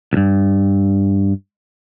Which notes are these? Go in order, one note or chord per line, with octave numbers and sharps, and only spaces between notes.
C2 G2